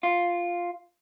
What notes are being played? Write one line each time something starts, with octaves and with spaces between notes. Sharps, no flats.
F4